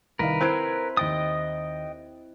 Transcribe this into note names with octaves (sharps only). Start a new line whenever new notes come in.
C2 D#3 A#4 B4 F5
C4 E4 C5 F#6 G#6 D7
D#2 D#5 G5 D#6 A6